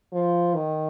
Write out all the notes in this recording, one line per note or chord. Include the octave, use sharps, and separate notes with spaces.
F3
D#3